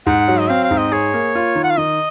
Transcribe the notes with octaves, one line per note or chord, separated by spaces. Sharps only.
G#2 F#5
F#3
D#5
C4 F5
F5
G#2
D#5
G#4 C#5
A#3
F4
D#3
F#5
F5
D#3 D#5